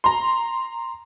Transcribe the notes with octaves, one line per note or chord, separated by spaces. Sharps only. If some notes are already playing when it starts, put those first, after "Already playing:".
A#5 C6